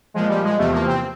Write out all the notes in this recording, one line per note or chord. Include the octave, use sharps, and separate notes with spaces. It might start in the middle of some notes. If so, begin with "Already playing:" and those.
A#2 F3 G#3
G3
G#3
E2 C3 F3 A3
A#3
C4